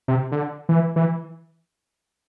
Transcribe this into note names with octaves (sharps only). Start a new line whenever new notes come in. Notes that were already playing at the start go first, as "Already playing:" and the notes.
C3
D3
E3
E3